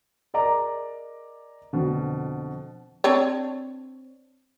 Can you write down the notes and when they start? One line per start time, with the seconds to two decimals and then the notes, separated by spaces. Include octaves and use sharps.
0.34 G#4 A#4 D5 D#5 A#5 D6
1.73 F2 B2 D3
3.04 C4 D4 C#5